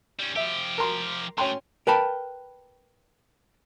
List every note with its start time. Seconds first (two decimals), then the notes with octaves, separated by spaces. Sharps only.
0.19 G3 C#4
0.36 F3 G4 E5
0.78 A#4 A#5 C6
1.38 A2 C#4 G5 C6
1.87 A#4 B4 G5 A5 B5